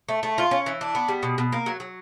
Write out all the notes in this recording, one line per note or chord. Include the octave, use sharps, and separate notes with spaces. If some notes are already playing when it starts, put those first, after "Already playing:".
A3
A3
F4
C#4
E3
D4
B3
G3
B2
B2
A#3
F#3
F#3